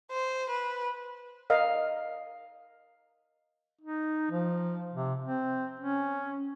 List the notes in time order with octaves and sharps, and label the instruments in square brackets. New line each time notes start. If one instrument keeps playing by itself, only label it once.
[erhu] C5
B4
[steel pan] A#4 D#5 F5
[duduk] D#4
F3
C3
C4
C#4